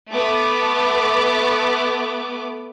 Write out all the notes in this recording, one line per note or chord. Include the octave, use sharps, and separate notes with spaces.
A3 B3 D6